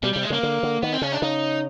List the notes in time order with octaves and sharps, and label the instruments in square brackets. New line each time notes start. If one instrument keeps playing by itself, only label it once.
[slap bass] B2 [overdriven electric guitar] G3
[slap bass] C3 [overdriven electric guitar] G3
[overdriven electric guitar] G#3
[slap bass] C#3 [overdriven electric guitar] A#3
[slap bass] D3
D3
[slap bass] D#3 [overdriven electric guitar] B3
[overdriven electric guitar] C4
[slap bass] C#3 [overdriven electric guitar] C#4
[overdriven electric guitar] D4
[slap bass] C#3 [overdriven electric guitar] D#4